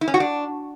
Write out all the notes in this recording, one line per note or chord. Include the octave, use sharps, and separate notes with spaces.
E4
C#4
F#4
D4